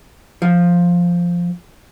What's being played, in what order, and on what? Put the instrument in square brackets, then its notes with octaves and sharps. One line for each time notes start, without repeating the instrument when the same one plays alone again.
[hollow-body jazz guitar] F3